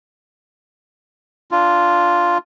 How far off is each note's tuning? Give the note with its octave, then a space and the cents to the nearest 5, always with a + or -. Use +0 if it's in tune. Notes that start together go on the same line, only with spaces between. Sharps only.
D4 +0 F4 +0